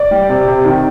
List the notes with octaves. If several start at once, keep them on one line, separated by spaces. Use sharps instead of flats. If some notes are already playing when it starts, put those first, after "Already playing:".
Already playing: D5
G3
C3
C3
D#3